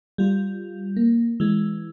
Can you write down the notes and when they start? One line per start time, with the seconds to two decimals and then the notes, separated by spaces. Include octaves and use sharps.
0.18 G3 F4
0.96 A#3
1.40 E3 G#3